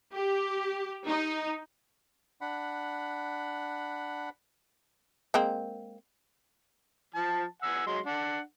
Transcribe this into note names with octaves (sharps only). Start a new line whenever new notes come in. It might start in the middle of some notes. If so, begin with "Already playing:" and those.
G4
D#4
D4 F#5 B5
G#3 A#3 C4
F3 A5
F#5 G#5 E6
F#3 G#3 C6
D4 F#5